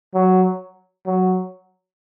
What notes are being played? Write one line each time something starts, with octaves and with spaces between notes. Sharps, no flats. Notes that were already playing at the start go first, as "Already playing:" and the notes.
F#3
F#3